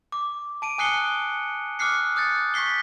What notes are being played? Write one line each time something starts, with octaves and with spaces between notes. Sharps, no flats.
D6
A5 D7 D#7
G#5 D#6 F#6 C7 C#7 G7
D6 D#6 F6 F#6 C7 C#7
D#6 F#6 G6 A6 C#7
C#6 G6 B6 C7 G7